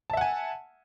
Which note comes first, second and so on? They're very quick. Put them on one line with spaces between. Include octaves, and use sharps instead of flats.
A5 E5 F#5 G#5